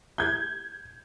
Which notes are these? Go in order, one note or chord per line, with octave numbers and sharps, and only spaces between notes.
G6 G#6